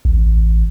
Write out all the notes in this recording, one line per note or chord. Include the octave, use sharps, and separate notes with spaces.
A1